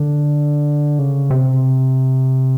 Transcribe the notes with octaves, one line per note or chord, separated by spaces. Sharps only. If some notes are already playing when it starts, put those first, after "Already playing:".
Already playing: D3
C#3
C3